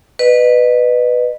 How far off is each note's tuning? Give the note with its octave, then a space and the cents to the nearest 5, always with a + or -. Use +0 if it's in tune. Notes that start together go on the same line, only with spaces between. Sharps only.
B4 +0 D#5 -35